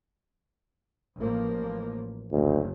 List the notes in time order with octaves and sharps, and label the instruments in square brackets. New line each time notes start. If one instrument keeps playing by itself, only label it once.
[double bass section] A1 F3 A#3
[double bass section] F#1 [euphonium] D2